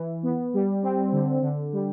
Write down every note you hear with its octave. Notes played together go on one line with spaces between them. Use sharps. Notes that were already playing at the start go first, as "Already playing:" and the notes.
Already playing: E3
B3
G3
C4
D3
D3
G3